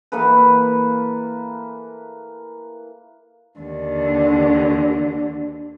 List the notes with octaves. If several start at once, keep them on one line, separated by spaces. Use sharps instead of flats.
E3 A#3 A4 B4
D#2 D3